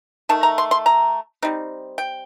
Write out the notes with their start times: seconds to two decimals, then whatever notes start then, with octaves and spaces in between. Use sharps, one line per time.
0.29 D#3 A3 A5
0.43 A#5
0.58 C6
0.71 C6
0.86 A#5
1.42 G3 C4 D#4
1.98 G5